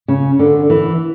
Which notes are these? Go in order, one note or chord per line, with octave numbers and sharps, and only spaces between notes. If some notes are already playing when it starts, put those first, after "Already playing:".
C#3
D3
E3